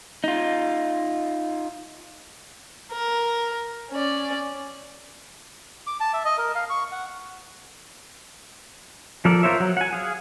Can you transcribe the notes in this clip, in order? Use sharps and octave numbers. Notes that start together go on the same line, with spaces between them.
D#4 F4
A#4
C#4 D5
D6
A5
E5
D#5
A#4
F5
C#6
F#5
F3 A4 A#4 D5
F4 A#4 C5 C#5 E5
F#3
F#5 G#5
G#4 F5